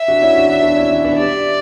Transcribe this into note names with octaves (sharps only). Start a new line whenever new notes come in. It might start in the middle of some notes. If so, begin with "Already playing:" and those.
Already playing: E5
D4 F#4
C#4 E4
D4 F#4
D4 F#4
B3 D4
C#4 E4
C#4 E4
B3 D4
G3 D5